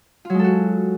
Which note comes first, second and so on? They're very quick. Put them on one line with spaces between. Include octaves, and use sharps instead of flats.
F4 F#3 G#3 A4 F#4